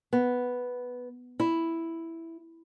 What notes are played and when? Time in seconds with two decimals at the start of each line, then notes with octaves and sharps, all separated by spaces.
0.13 B3
1.40 E4